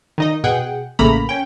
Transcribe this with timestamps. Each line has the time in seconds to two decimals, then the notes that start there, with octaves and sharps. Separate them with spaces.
0.18 D#3 D#4 D#5
0.44 B2 G#4 F#5 G5
0.99 A1 C#3 A3 A#3 A#5 B5
1.29 C#4 G5